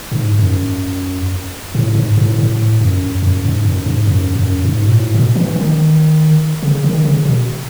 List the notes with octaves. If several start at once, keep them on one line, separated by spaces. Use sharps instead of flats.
G#2
F#2
A2
G#2
A2
A2
F#2
F#2
G#2
F#2
G#2
F#2
F#2
G#2
B2
A2
B2
E3
D#3
C#3
D#3
C#3
B2